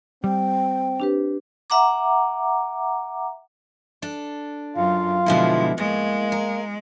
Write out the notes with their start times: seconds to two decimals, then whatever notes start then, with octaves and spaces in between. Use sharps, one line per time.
0.24 G3 C4 G5
1.00 D4 G4 B4
1.70 E5 F#5 A#5 D6
4.02 D4 A4
4.76 F#2 F4 F5
5.26 B2 D3 F3 G#3 E4
5.78 A2 G#3 A#3
6.32 A#4